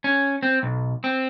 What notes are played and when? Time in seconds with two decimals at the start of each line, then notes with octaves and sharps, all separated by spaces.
0.04 C#4
0.43 C4
0.63 B1
1.04 C4